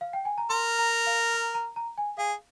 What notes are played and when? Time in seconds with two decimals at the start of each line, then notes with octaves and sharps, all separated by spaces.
0.01 F5
0.13 G5
0.25 G#5
0.38 A#5
0.49 A#4 C6
0.79 A#5
1.07 F5
1.34 A#5
1.54 A#5
1.76 A#5
1.98 G#5
2.18 G#4 F5